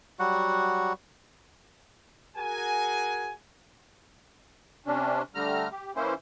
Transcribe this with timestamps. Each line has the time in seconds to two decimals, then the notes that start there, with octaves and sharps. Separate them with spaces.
0.19 F#3 G3 F#4 F#5
2.37 F#4 G#4 A#4 F#5 G#5
4.86 C3 C#4 D4
5.35 D3 G3 A3 A#5 F6
5.71 G4
5.96 E3 A#3 C#4 E4 C5